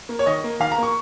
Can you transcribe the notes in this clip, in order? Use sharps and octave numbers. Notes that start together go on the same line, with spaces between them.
A#3
C#5
D#3 D#5
A#3
D#3 F5
A#5
A#3 C#6